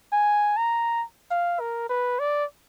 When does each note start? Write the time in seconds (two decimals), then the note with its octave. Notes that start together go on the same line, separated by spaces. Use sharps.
0.12 G#5
0.57 A#5
1.31 F5
1.60 A#4
1.89 B4
2.19 D5